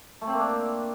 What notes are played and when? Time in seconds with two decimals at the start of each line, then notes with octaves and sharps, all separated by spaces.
0.21 A3
0.27 C4
0.33 A#3
0.39 D4